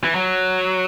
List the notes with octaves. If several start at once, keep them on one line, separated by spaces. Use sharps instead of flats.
E3
F#3